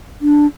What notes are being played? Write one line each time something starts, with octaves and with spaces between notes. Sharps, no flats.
D4